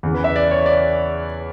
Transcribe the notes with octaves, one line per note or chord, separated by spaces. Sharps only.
E2 C#3 E3
B4
E5
D5
C#5
D5